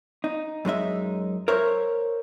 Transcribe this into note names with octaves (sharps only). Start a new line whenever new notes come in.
D#4
F#2 G#3 D#4 E5
A#4 C5 C#5 E5